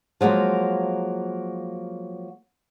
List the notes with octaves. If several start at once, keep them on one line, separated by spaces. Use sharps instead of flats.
F3 F#3 G#3 A#3